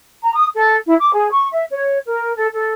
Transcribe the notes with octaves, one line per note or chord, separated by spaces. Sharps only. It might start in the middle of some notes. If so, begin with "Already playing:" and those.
A#5
D#6
A4
E4
D6
G#4
C#6
E5
C#5
A#4
A4
A4